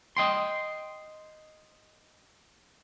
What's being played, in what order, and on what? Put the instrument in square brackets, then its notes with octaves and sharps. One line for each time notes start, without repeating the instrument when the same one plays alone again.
[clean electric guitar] D#5 G5 C6